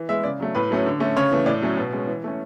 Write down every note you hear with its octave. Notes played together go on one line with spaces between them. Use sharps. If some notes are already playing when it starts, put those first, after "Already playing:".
Already playing: E3
G#3 B3 E5
C#3 D5
F#3 A3
A2 B4
F#3 A3 C#4
D3
A3 C#4
C#3 C#5
E3 A3
A2 D5
F#3 A3 C#4
B2
G#3 C#4
E3
A3 C#4